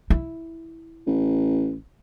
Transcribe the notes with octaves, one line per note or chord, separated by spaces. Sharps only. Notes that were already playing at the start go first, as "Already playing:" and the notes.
E4
A1